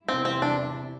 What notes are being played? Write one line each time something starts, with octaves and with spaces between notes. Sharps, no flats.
E2 C3 E3 G3 C4 E4
C4
D4